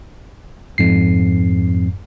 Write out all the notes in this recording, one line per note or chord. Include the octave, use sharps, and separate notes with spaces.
F2 G#2 C7